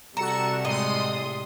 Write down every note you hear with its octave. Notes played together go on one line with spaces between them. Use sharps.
C3 G3 F#4 A4 A#5 C#7 E7
A2 G#3 D#5 C6 D#6